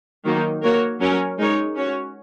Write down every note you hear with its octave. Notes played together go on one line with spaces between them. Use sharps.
D#3 F#3 A#3 D#4
A#3 F#4 A#4 C#5
F#3 C#4 A#4 C#5
G#3 D#4 A#4 C#5
C#4 F#4 C#5